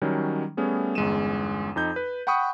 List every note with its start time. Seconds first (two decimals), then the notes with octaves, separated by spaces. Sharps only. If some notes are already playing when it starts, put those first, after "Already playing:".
0.02 D#3 F#3 G3 C#4
0.57 G3 A3 B3 C#4 G#4
0.95 G1 E2 G#3 C#4 D#7 E7
1.76 F2 D#4 G6
1.96 B4
2.27 F#5 G5 B5 C#6 D#6